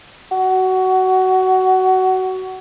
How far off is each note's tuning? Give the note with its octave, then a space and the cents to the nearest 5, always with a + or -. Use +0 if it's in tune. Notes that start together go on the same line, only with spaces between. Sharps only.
F#4 +20